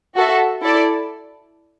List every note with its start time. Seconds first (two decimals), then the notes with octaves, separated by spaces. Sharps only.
0.16 F#4 A4 E5
0.61 E4 A4 D5